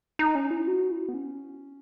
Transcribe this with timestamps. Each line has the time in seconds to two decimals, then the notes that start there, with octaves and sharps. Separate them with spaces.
0.19 D#4
0.35 C#4
0.51 E4
0.67 F#4
0.91 E4
1.09 B3
1.14 C#4